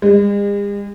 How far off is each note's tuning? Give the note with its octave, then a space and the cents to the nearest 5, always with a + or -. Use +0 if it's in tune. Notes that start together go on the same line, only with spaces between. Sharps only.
G#3 -45